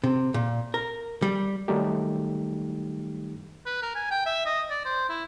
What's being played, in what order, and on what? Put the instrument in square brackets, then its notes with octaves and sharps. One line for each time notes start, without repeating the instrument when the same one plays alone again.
[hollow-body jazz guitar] C3
A#2
A#4
G3
[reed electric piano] D#3 F#3 G3 A3 D#4 G4
[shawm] B4
A#4
G#5
G5
E5
D#5
D5
C5
E4